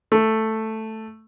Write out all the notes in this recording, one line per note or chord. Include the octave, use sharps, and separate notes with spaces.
A3